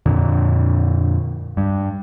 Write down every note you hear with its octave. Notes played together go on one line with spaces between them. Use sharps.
F2 A#2 D3
G2